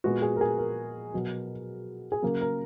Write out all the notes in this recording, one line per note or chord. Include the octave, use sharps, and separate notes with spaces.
A#2 G#3 B3 F#4
G#4
A#4
G#4
A#4
B2 F#3 B3
G#4
C#3 F#3 A#3 A#4
A#4